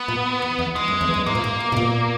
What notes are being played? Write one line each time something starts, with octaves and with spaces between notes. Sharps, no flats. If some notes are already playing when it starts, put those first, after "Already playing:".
Already playing: B3
A#2
E2
E2
G#2 G#3
F#2
E2
F#2
G#2 A#3
A#2
G#2
B2
B2
A#2